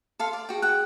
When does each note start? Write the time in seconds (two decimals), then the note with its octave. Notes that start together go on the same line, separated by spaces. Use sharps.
0.19 A4 F5 C6
0.33 D5
0.49 F#4 G#4 G5
0.62 F#5 G5 F#6